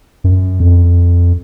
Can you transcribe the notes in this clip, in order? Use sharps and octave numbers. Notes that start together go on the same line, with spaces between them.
F#2
F2